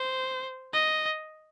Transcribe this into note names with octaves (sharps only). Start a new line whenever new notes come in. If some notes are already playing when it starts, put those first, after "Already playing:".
Already playing: C5
D#5